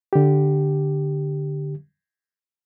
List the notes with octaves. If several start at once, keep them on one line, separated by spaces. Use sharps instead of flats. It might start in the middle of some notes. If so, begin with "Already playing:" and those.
D3 G4